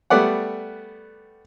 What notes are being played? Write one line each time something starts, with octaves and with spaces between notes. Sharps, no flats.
G3 A3 B3 D5 F#5